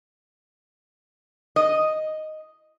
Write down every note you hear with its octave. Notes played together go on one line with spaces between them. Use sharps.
D#5